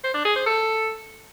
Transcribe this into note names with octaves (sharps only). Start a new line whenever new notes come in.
C5
D4
G#4
C5
A4